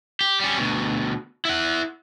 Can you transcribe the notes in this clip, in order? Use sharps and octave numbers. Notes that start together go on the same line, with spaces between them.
G4
G3 C#4
D2 B2
E4 F#5